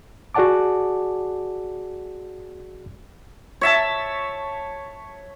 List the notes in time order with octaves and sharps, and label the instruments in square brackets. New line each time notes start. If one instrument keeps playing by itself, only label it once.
[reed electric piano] F#4 G#4 D5 F#5 A5 D6
[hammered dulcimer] C#5 E5 A5